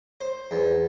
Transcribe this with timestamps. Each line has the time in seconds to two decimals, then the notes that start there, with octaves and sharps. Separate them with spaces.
0.21 C5
0.51 E2